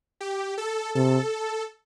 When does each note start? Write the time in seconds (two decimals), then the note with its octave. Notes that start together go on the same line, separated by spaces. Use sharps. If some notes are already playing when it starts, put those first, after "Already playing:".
0.21 G4
0.58 A4
0.95 C3 A4